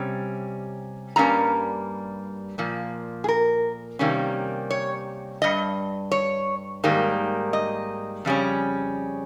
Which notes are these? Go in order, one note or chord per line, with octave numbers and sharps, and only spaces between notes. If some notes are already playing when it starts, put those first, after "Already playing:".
Already playing: C3 G3 C#4
G2 G3 A#3 C#4 A#5
A#2 F3 A#3
G#4
A#4
C3 D#3 G3 A#3 C#4
C#5
G2 G3 D#5
C#5
G#2 D#3 G3 A#3
D#5
F2 C#3 G3 C#4